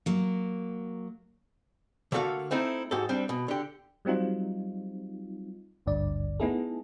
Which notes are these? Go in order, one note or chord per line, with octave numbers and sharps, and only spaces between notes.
F#3 A#3
D3 A3 A#3 F#4 A4 F5
A3 C4 D#4 E4
G#2 F#4 G4 A4
G3 C4 D4
B2
D3 G4
F#3 G3 C4 D#4 F4
G#1 D2 G2 D3 D5
A3 B3 D#4 E4 G#4 A4